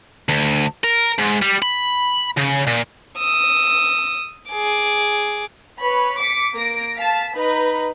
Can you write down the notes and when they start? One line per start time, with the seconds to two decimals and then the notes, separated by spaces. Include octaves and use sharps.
0.29 D2
0.84 A#4
1.18 G#2
1.42 G3
1.62 B5
2.37 C#3
2.67 A#2
3.19 D#6 E6
4.52 G#4 D6
5.81 B4 C#5 B5
6.20 D6 B6 C#7
6.54 A#3 A#6 D7
6.97 F5 A5 B6
7.35 D#4 B4 B5